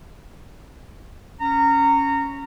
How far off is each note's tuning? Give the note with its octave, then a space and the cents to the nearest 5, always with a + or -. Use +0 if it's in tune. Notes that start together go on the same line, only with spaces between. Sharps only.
C#4 +0 A#5 -20